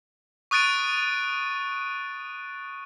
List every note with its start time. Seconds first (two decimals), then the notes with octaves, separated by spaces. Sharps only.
0.51 C#6 D#6 F#6 A6 D7 D#7